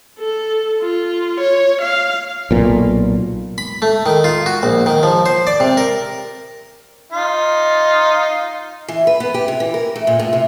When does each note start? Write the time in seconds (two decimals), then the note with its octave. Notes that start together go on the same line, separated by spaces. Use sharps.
0.19 A4
0.82 F4
1.40 C#5
1.82 F5
2.51 B1 A#2
3.58 B5
3.82 A3
4.06 D#3
4.24 F4
4.46 F#4
4.63 A#1
4.86 D#3
5.03 F3
5.26 C5
5.47 D5
5.60 C3
5.77 A#4
7.12 D#4 F4
8.88 E3
9.07 B4
9.20 B3
9.34 G4
9.48 C3
9.60 E3
9.74 A#4
9.96 A3
10.07 A#2
10.19 A2
10.33 C3